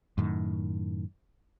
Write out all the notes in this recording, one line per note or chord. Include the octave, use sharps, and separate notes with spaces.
F#2 A2 D#3